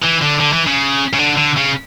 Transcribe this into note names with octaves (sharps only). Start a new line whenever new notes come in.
E3
D3
D3
E3
C#3
C#3
D3
D3
C#3